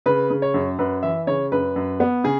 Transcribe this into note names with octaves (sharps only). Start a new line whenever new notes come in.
C#3 B4
C#3
C#5
F#2
F#2 B4
E3 E5
C#3 C#5
F#2 B4
F#2
B3
C#3 G#4